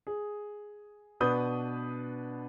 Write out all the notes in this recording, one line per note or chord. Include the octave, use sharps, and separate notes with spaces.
G#4
B2 D4 B4 D#6 G6